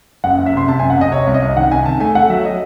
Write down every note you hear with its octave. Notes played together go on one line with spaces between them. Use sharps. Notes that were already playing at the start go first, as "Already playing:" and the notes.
F#1 F#5
F#1
E5
C3 C6
C3 A5
G#5
F#1
F#5
C3 D#5
C3 C#5
C2
D#5
C2
D#3 F#5
C3 G#5
D#3 A5
A3 G#5
A3 F#5
F#3 E5
D#5